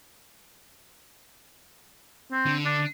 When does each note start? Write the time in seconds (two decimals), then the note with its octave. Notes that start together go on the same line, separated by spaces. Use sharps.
2.32 C4
2.46 D3
2.65 D4